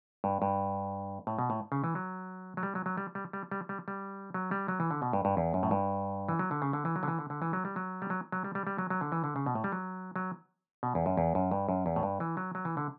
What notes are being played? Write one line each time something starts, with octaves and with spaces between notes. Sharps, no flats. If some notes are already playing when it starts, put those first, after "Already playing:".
G2
G2
A2
B2
A2
C#3
E3
F#3
F#3
G3
F#3
F#3
G3
G3
G3
G3
G3
G3
F#3
G3
F#3
E3
D3
B2
G2
G2
E2
F#2
A2
G2
E3
F#3
D3
C#3
D3
E3
F#3
D3
E3
D3
D3
E3
F#3
G3
F#3
G3
F#3
F#3
G3
G3
G3
F#3
F#3
D3
E3
D3
C#3
B2
A2
G3
F#3
F#3
B2
E2
F#2
E2
F#2
G2
F#2
E2
A2
G2
E3
F#3
F#3
E3
D3